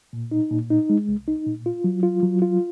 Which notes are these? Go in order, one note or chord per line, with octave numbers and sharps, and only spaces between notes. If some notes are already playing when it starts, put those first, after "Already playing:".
A#2
D#4
A#2
D#4
G#3
C2
D#4
A#2
F4
F#3
F4
F#3
F4